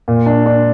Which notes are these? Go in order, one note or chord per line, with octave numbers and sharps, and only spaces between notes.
A#2
D4
D4